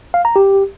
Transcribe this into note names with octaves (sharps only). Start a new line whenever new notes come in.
F5
A#5
G4